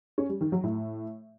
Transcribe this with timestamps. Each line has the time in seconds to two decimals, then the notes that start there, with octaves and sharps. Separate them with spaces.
0.18 C#4
0.29 G3
0.41 D#3
0.52 F#3
0.64 A2